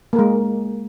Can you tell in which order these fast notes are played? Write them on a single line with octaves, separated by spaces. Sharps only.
A#3 A#4 G#3